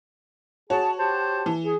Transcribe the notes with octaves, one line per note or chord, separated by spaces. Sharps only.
F#4 G#4 C#5 A5
G4 C5 A5
E3
G#4